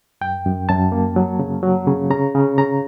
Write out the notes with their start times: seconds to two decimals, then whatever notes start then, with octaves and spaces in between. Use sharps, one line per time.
0.21 F#2 G5
0.46 F#2
0.69 F#2 A5
0.92 A#3
1.16 F#3
1.39 C#3
1.63 F#3
1.87 C#3
2.10 C#3 A#5
2.35 C#3
2.58 C#3 A#5